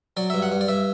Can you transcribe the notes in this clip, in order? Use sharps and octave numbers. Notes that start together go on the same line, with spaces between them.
F#3 D5
G2 E5
F#5
G2
D5
G2 E5